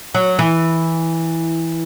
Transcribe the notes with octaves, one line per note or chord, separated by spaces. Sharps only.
F#3
E3